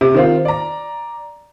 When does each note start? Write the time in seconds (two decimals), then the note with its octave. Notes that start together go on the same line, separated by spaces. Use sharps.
0.01 C3
0.14 D#3 C4 F4
0.45 D5 A#5